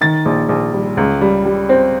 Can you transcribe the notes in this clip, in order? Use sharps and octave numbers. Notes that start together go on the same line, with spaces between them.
D#3 A6
A#1
A#1
G3
C#2
G3
G3
C4